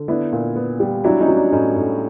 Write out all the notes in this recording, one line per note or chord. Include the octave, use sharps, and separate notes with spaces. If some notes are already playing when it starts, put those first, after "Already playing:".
Already playing: D3
B3 D4 E4
A#2
B3
G3
F#3 D4 E4
C#4 D#4
F#3
D4
A2 C#4 D#4
A2